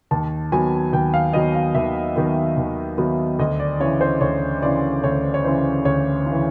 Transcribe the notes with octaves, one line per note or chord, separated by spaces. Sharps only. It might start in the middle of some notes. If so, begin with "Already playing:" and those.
D#2 A5
D#3 F#3 B3 G#5
D#2 G5
F5
D#3 F#3 B3 D#5
F5
D#2 E5
D#3 F#3 B3
D#2
D#3 F#3 B3
D2 D#5
D5
C#3 E3 C#5
C5
D2 C#5
C#3 E3 D5
D2 C#5
C#5
C#3 E3 C5
D2 C#5
C#3 E3